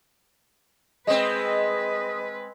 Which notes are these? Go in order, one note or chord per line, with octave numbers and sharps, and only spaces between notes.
G#3 C4 B4 D#5